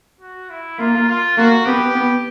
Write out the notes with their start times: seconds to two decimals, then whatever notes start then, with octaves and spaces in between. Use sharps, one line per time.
0.21 F#4
0.50 E4
0.79 A#3 F4
1.08 F4
1.37 A#3 F#4
1.65 B3 G4
1.94 B3